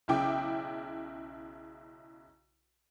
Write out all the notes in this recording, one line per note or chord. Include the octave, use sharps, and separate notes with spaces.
B1 C#3 E4 G5 D6